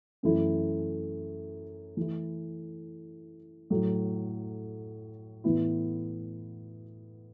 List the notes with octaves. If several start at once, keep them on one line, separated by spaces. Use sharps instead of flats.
F#2 E3 A3 E4
E3 A3 E4
A2 F#3 A3
A2 E3 B3 E4